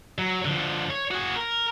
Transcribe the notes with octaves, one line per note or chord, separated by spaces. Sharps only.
F#3
D3 F3
C#5
F#4 G#4
A#4